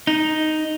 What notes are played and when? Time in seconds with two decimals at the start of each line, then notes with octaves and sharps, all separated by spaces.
0.07 D#4